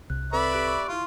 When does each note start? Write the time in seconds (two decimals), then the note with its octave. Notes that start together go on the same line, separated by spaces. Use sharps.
0.10 C2 F#6
0.33 C4 A4 B4 D5 E5 B5
0.52 G4 F#6 D7
0.67 C#6
0.88 E4 F4 C6